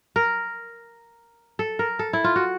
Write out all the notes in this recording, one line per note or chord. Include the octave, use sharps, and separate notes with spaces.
A#4
A4
A#4
A4
E4
F4
F#4